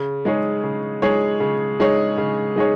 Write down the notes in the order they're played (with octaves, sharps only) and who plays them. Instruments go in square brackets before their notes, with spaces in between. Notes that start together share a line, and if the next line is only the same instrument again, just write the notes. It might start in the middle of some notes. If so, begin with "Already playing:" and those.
Already playing: [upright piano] C#3
G#3 D#4 G#4 C#5
C#3
G#3 D#4 G#4 C#5
C#3
G#3 D#4 G#4 C#5
C#3
G#3 D#4 G#4 C#5